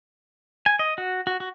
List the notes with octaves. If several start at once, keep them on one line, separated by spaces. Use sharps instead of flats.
G#5
D#5
F#4
F#4
F#4